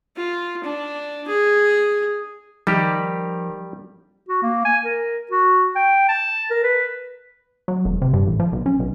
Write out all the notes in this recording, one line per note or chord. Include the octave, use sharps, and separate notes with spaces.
F4
D4
G#4
D#3 F3 G3 G4
F#4
A#3
G#5
A#4
F#4
G5
A5
A#4
B4
F#3
E1
C3
G2
A1
F3
B1
C#4
B1